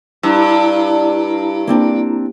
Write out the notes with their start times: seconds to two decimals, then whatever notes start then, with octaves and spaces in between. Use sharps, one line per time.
0.23 G2 E4 A#5
1.67 A#3 C4 D4